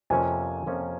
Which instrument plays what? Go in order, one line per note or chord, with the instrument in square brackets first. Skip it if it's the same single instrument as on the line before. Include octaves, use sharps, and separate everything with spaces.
[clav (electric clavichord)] F2 C3 F3 A#3 C#4 [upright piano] G#5
[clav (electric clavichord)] F2 C3 F3 A#3 C#4